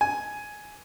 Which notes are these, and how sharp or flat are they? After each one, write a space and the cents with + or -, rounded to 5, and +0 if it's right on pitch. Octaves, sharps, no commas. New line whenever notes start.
G#5 +10